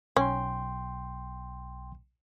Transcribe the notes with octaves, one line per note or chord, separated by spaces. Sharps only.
B1 C#4 G5 C6